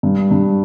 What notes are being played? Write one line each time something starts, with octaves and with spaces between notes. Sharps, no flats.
G2
G2